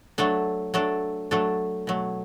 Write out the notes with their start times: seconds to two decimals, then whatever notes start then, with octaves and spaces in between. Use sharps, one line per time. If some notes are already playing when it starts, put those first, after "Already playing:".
0.18 F#3 A3 D4 A4
0.74 F#3 A3 D4 A4
1.31 F#3 A3 D4 A4
1.87 B2 F#3 A3